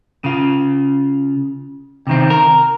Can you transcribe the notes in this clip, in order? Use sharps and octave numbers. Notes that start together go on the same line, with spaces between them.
C#3 F4
C3 D#3 C4
A#4